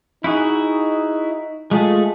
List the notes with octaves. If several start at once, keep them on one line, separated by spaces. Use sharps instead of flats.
D#4 E4 F#4 G#4
G#3 A3 F4 G#4